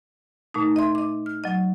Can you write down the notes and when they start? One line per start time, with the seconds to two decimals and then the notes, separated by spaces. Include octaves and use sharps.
0.54 A#2 A3 D#4
0.76 D#5 E5 C6
0.95 D#5 D6
1.26 F6
1.44 F#3 D#5